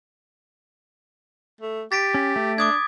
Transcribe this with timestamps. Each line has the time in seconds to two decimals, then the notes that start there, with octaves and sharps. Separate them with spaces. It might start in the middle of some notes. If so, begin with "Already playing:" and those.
1.61 A3
1.92 G4 A6 B6 D7
2.14 C#4
2.36 A3
2.58 D4 D6 D#6 G#6